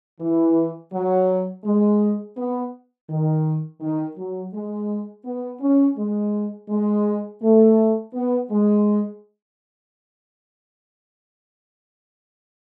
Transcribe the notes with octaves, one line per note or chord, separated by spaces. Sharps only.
E3
F#3
G#3
B3
D#3
D#3
F#3
G#3
B3
C#4
G#3
G#3
A3
B3
G#3